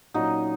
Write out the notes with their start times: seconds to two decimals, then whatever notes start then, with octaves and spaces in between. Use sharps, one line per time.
0.14 A#2 F#3 C#4 D#4 F#4